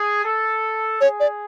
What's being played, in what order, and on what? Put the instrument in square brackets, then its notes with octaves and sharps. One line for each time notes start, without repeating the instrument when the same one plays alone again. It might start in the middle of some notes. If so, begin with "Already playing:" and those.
Already playing: [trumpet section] G#4
A4
[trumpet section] G#4 [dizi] C#5
[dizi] D5